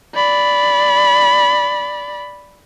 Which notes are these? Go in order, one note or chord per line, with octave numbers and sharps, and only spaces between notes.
D5 B5